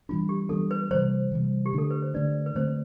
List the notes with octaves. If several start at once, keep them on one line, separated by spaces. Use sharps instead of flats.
E3 G3 B3 D4 F4
G4
E3 G3 B3 D4 A4
B4
C3 E3 G3 C5
C3 E3 G3
G4
D3 A3 D4 A4
B4
C5
D3 A3 D4 B4 D5
B4
D3 A3 C4 C5